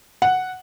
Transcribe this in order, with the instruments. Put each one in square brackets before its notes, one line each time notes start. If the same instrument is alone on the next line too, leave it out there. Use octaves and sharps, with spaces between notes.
[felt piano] F#5